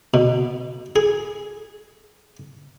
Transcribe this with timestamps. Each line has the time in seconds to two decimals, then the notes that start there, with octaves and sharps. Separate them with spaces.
0.14 B2
0.96 G#4